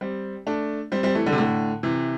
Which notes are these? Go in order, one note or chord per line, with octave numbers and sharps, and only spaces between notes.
G3 C4
A3 D4
G3 C4
G3 C4
E3 A3
D3 G3
C3
A2 D3
C3 E3